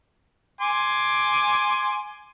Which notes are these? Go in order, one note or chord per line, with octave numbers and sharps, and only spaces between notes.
G#5 C6 D6